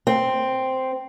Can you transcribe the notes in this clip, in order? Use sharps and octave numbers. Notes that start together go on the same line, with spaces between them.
C4